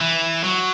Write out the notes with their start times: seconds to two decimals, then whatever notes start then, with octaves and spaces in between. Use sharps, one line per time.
0.01 E3
0.44 F#3